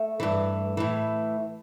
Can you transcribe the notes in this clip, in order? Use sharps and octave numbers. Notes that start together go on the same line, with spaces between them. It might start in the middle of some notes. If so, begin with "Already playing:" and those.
Already playing: A3
G2 E3
A2 E3